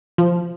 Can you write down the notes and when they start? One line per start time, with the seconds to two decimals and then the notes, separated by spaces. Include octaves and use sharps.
0.18 F3